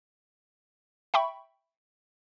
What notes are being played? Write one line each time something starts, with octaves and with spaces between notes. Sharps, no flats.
E5 G5 B5 C#6